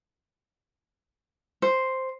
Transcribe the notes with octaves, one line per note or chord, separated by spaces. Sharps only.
C5